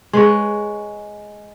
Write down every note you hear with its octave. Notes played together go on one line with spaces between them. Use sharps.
G#3 B4 C#5